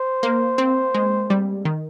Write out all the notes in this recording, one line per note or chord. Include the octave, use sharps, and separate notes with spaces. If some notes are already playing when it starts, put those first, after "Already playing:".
Already playing: C5
A#3
C4
G#3
G3
D#3